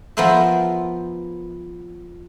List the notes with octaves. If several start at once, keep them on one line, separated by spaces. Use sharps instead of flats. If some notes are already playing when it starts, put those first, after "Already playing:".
F3 B3 A#4 C5 E5